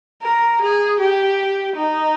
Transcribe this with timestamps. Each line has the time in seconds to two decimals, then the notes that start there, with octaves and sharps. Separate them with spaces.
0.22 A#4
0.61 G#4
1.00 G4
1.76 D#4